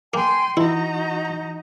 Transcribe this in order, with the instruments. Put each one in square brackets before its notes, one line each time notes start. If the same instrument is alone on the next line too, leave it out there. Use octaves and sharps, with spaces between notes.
[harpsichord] A#3 [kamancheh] G5 C6 [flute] G#5
[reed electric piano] E3 [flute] D#4 [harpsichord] E4 [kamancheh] F#4 A#5